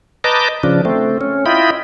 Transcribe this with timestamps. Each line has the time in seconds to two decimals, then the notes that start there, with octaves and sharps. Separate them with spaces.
0.24 B4 D#5 A5 A#5 D6 G6
0.63 C#3 F3 D4
0.85 A3 C4
1.21 C#4
1.46 E4 F4 D#5 G5 B5